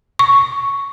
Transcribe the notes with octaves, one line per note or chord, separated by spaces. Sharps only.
C#6